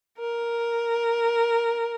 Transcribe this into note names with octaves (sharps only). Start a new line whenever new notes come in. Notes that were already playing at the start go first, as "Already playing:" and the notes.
A#4